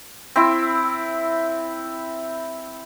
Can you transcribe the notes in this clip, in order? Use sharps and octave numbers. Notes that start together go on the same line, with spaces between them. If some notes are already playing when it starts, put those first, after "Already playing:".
C4 E4